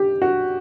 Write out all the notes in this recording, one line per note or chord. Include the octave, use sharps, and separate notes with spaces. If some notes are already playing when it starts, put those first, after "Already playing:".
Already playing: G4
F#4